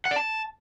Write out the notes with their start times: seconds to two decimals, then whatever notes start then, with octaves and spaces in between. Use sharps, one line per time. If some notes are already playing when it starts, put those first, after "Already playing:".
0.05 F#5
0.11 D5
0.16 A5